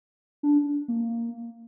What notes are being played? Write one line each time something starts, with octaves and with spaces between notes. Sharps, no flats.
D4
A#3